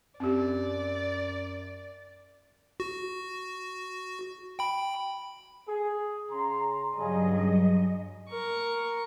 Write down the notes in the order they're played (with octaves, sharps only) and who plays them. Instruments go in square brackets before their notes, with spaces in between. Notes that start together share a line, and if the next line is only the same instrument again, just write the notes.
[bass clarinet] F#2 [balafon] C4 G4 [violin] D5
[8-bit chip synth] F#4
G5 B5
[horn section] G#4
C#3 A#5 C6
[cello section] G2 F#3 D#5 [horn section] C#3 G3 G#4
[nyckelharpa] A#4 C#6